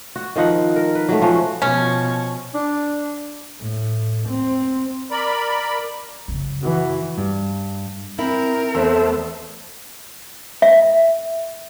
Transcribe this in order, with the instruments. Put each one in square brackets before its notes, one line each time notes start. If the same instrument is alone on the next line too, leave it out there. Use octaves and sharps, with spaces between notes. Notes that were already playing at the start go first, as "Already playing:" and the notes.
[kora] F#4
D#3 F3 D#4 F#5
A#4
B4
F#3 A3
F3 C#4 F#4
[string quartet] B2 F3 C#6 [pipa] C#4
[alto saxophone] D4
[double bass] A2
C4
[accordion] A#4 D5 B5
[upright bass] F#2 C#3
[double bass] E3 [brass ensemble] F#4
[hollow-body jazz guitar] G2
[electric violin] C4 [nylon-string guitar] E4 [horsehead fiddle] A#4
[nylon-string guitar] E2 [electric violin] A3 B3 [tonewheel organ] A4 C5 E5
[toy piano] E5